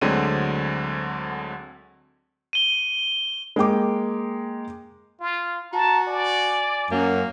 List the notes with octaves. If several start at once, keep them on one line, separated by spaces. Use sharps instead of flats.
D2 D3 F#3 G#3 C4 D#7
D#7 G7
G#3 A#3 G5 D6
F4
F#4 A5 A#5
D5 G#5
F#2 A#3